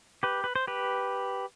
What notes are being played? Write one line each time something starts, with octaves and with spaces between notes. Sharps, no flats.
G4 B4
B4
C5
G4 B4